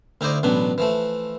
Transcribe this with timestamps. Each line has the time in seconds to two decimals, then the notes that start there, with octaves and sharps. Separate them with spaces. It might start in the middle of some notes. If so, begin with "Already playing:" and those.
0.21 D2 D#4 E4 C5 D5 D#5
0.43 A1 B2 F#3 D4 B5
0.78 E3 F3 A3